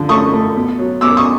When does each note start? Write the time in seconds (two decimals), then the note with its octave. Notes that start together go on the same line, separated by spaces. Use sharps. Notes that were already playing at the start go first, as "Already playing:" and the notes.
Already playing: D3 F3
0.09 A3 C#6 D#6
0.33 A3
0.56 B2
0.78 F#3
1.01 B2 D6 E6
1.17 C#6 D#6